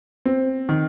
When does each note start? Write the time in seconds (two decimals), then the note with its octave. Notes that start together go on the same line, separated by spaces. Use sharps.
0.25 C4
0.69 D#3